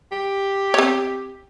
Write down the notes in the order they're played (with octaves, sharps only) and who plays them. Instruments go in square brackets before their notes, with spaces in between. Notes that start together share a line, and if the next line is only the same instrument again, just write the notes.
[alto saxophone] G4
[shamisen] C4 C#5